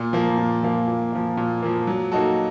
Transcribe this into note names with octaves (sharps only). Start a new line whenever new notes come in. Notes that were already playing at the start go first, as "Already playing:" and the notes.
Already playing: A#2
F3 A#3
A#2
F3 A#3
A#2
F3 A#3
A#2
F3 A#3
F#3
A#3 D#4 F#4 A4